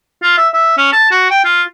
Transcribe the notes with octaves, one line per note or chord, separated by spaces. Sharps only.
F4
E5
E5
C#4
A5
F#4
G5
F4